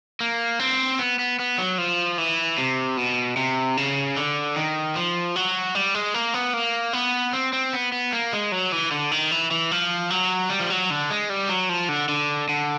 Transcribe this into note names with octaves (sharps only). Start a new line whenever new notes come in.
A#3
C4
B3
B3
B3
F#3
F3
E3
C3
B2
C3
C#3
D3
D#3
F3
F#3
G3
G#3
A#3
B3
A#3
B3
C4
C4
B3
B3
A#3
G#3
F#3
E3
D3
D#3
E3
E3
F3
F#3
G3
F3
F#3
D3
G#3
G3
F#3
F3
D3
D3
D3